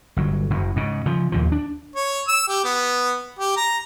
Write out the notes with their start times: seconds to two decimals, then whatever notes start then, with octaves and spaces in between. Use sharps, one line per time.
0.17 G1 F#3
0.50 F#1 F#2
0.76 G#2 C#3
1.06 C#3 F3
1.32 D#2 A#2 F3
1.52 D4
1.95 C#5
2.28 E6
2.49 G4
2.65 B3
3.39 G4
3.57 A#5